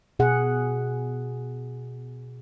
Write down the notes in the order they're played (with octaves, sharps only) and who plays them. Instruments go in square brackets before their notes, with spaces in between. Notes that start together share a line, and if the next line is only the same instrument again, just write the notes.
[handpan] B2 G#4 F#5